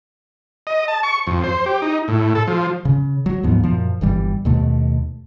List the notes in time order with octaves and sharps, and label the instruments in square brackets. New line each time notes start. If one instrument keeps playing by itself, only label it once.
[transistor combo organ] D#5
A5
C#6
F2
C5
G4
D#4
A2
A4
F3
[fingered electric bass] C#3
F#3
D#2 G#2 F3 B3
F#2 A#2 F3
G1 G2 E3 G3
D#2 B2 A3